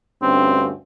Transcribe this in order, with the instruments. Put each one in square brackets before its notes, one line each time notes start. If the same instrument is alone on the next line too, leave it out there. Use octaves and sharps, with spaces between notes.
[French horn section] D2 G2 C#4 [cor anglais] C4